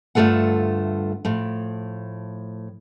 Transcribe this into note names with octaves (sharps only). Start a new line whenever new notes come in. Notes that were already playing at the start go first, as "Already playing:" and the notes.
D2 G2 A3 F4 A4 F#5
A2 F3